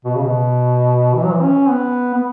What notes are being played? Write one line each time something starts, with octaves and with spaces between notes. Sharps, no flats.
B2
C#3
B2
E3
F#3
E3
C#4
B3
B3